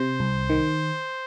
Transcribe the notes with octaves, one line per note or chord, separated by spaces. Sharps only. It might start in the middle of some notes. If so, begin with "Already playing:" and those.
Already playing: C3 C5
C2
D#3